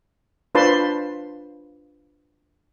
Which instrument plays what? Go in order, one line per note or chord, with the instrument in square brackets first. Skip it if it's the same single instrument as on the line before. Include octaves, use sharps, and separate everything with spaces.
[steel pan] D4 F4 B4 C5 A5 C6